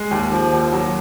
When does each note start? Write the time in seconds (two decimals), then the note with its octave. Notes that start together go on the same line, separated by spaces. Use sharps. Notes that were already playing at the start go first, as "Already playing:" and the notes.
Already playing: G#3
0.11 D#2
0.32 F3
0.52 D#2
0.72 F#3